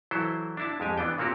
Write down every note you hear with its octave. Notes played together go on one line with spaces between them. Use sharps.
E3 F#3 E4 A4 C5
D4 E4 A5
F2 G#3 G4 G#5
E3 B3 D4 G5
A#2 A#3 C4 F#4 G4